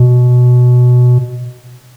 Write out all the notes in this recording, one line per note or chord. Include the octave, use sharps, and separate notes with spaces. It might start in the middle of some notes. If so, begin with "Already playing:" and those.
Already playing: B2